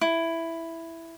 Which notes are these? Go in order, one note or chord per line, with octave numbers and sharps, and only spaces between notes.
E4